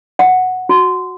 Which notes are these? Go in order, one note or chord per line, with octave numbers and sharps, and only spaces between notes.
F#5
F#4